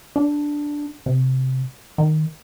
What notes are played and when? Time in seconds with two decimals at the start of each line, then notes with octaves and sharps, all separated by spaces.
0.16 D4
1.06 C3
1.98 D#3